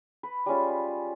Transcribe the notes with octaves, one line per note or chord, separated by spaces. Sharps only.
B4
G3 G#3 C#4 F4